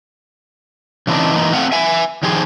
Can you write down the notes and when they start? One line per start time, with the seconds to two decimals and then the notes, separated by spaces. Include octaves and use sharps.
1.07 C#3 E3 C4 D4 D#4
1.36 E3 A#3 D#4
1.53 A3 C4 F5 F#5
1.72 E5 G#5
2.23 D#3 F3 G4 G#4 C5